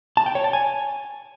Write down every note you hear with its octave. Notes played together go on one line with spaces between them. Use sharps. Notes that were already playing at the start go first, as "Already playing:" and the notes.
A5
G5
C#5
A5
G#5